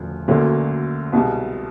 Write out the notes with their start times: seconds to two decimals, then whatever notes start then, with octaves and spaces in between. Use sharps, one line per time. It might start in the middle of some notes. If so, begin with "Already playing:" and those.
Already playing: E1 D2 C#3 F3
0.28 D2 D3 F#3 A#3 C#4
1.13 C2 B2 G#3